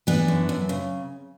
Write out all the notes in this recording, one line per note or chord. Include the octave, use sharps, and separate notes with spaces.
E3 B3 D4
F#2
F#2
C#3